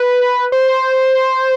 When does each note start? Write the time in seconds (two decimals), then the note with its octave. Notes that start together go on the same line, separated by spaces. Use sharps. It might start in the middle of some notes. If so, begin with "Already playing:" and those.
Already playing: B4
0.52 C5